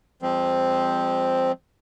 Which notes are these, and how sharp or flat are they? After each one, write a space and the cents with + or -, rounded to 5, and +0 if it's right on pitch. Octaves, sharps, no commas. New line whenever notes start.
F3 +0 G#3 -35 C4 +0